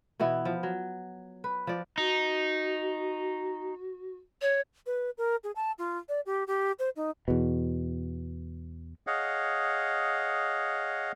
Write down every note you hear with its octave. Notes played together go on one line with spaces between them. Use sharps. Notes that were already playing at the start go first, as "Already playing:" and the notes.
B2 E3 B3 E4
F3
F#3
B4
F3 D5
D#4 F#4
C#5
B4
A#4
G#4
A5
F4
D5
G4
G4
C5
D#4
E2 B2
G#4 C#5 D#5 F5 F#5